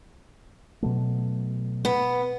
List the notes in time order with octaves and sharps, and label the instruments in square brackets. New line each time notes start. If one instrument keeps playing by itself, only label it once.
[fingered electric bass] B2 F#3 A3
[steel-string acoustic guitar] B3